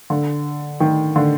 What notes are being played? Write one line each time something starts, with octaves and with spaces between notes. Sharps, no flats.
D3
D#3
D3